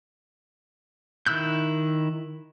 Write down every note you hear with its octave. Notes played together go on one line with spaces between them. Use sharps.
D#3 E4 E6 F#6 G6